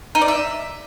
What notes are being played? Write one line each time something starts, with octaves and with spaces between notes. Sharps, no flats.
D#4
D5
E5